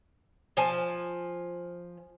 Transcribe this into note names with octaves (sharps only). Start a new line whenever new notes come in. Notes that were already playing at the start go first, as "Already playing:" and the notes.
F3 G#5 A5